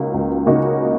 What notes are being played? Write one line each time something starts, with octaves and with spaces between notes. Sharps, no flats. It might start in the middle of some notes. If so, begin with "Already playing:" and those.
Already playing: C#2 C#3 A#3 D#4 F#4
C#2
C#3 A#3 D#4 F#4